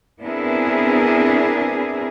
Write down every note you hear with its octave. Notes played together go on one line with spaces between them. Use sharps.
B3 C4 D4 E4 G#4 A#4